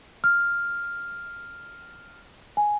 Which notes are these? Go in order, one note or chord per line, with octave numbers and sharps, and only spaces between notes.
F6
G#5